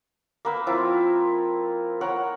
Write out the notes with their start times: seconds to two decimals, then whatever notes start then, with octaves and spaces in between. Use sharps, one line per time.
0.45 A#3 B4 E6
0.67 F3 C4 E4 F4
2.01 A#4 C#5 F#5